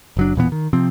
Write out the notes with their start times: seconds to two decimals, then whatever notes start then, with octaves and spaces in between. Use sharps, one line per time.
0.17 F#1 F#3 D4
0.35 E1 A#2 E3 B3
0.52 D#3
0.73 C3 F3 C4